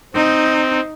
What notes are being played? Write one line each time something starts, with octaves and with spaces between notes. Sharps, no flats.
C4 D#4